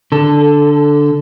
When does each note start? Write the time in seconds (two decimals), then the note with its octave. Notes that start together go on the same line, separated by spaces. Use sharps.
0.12 D3 A4